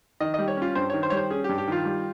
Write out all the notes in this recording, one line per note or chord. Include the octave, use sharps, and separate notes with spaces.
D#3 D#5
D#5
G3
C#5
C#4 F4
G2 C5
D#3 C#5
C5
G3 C#5
C5
C#4 G#4
G4
G2
G4
D#3 F4
G3